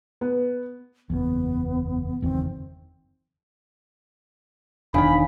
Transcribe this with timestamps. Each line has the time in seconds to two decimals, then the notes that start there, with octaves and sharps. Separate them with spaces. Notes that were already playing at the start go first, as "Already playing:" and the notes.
0.21 B3
1.10 F#1 E2 B3
2.22 F#1 E2 D#3 C4
4.94 E1 D#3 D4 F5 G#5 B5